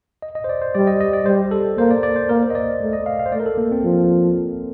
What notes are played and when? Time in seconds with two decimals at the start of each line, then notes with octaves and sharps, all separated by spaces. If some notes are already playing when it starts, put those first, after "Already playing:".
0.22 D#5
0.35 D#5
0.44 C5
0.49 D5
0.62 C5
0.75 G3 D5
0.87 D#5
1.01 D#5
1.13 D5
1.26 G3 C5
1.51 A4
1.78 A#3 C5
1.91 D5
2.03 D5
2.16 C5
2.29 A#3 A#4
2.43 C5
2.50 D#5
2.55 D5
2.81 A3
2.93 D#5
3.06 F5
3.19 F5
3.26 C5
3.32 A3 D5
3.40 A#4
3.46 A4
3.58 A#3
3.72 C4
3.84 F3